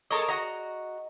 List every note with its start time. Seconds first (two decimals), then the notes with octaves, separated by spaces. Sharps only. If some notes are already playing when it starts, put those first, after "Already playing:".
0.11 G#3 A4 A#4 C#5 D#5
0.29 F#4 D#5 A#5